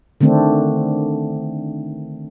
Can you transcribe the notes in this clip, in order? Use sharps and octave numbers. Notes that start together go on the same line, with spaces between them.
D3 D#3 A3 C4 D4